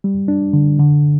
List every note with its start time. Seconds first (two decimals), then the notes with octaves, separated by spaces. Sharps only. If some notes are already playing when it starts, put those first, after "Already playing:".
0.04 G3
0.28 D4
0.53 D3
0.79 D3